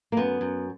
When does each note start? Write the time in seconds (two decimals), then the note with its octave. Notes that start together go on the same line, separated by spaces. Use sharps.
0.12 A#3
0.17 F#2 B3
0.41 F#2